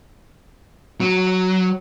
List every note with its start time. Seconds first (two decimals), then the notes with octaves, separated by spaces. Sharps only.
1.00 F#3